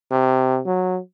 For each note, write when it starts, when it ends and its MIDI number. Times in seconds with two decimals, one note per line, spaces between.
0.11 0.60 48
0.66 0.99 54